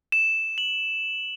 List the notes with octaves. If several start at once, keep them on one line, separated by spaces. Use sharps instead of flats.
E7
F#7